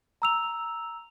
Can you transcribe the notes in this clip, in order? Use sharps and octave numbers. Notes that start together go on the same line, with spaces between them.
A#5 E6 F7